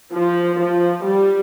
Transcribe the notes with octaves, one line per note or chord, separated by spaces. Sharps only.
F3
F3
G3